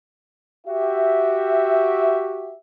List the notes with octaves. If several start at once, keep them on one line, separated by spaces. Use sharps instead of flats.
F#4 G4 E5